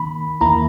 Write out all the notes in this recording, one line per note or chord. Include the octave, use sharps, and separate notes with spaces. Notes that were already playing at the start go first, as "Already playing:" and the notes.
Already playing: D#3 A#3 B5
E2 D#3 A#3 E4 A#5